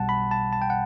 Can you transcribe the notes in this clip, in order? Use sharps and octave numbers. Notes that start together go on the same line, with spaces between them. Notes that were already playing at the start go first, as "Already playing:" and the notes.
Already playing: B1 B2 G3 F#5 A5
B5
A5
A5
G5
F#5